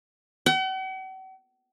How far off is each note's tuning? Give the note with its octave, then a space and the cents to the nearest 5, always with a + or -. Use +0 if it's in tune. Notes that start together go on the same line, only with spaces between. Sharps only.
F#5 +45